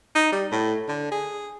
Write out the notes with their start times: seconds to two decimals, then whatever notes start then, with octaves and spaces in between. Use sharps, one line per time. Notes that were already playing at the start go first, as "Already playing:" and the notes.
0.16 D#4
0.32 G3
0.52 A2
0.88 D3
1.11 G#4